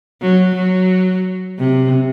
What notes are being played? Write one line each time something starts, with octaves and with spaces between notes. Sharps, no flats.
F#3
F#3
C3